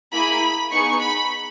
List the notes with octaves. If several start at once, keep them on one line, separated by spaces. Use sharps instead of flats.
A#3 E4 G#4 B5
B3 D#4 G#4 C#6
B5